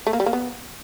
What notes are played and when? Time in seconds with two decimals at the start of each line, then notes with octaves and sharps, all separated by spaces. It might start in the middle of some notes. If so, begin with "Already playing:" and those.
0.07 A3
0.13 A#3
0.20 G3
0.26 A#3
0.33 B3